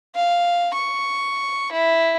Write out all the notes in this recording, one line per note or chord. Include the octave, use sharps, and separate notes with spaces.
F5
C#6
E4